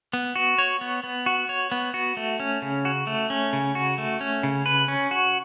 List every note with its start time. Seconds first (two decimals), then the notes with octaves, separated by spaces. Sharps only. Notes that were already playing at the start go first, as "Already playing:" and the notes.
0.13 B3
0.36 F#4
0.58 C#5
0.81 B3
1.04 B3
1.26 F#4
1.49 C#5
1.72 B3
1.94 F#4
2.17 A3
2.40 C#4
2.62 C#3
2.85 F#4
3.07 A3
3.30 C#4
3.53 C#3
3.75 F#4
3.98 A3
4.21 C#4
4.43 C#3
4.66 B4
4.88 C#4
5.11 F#4